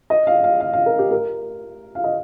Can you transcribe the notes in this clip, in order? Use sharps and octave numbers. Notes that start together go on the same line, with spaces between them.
D#5
F5
F5
F5
F5
A#4
G4
A#4
F5
D#5